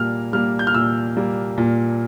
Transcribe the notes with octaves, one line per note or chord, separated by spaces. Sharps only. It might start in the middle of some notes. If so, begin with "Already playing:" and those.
Already playing: A#2 G3 A#3 F6
G3 A#3 F6
G6
F6
A#2 E6
G3 A#3
A#2